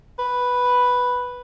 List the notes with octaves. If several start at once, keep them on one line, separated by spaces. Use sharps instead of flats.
B4